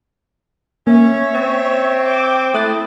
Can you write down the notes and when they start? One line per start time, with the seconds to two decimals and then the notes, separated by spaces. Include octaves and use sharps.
0.87 A#3 C#4 C#5 E5
1.35 C4
2.06 G5 D6
2.54 A3 E4 D#6 F#6 A6